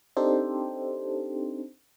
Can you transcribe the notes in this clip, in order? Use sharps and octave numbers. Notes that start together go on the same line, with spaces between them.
C4 D4 D#4 G4 A4 C5